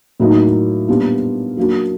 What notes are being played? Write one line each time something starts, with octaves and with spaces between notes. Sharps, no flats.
A2 F#3 A#3 D#4
A#2 G3 B3 D4 F4
F#3 A#3 D4 F#4